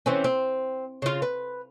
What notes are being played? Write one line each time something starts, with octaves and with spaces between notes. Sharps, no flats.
E3 C4 C#4
C4
C#3 F4
B4